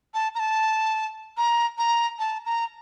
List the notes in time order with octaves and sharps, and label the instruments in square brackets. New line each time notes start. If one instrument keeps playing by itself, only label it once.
[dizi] A5
A#5
A5
A#5
A#5
A5
A#5